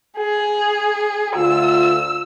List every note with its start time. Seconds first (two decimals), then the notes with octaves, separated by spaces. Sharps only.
0.17 G#4
1.36 D2 F4 E6